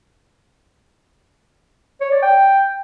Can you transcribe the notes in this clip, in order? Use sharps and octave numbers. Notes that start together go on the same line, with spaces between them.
C#5
D5
G5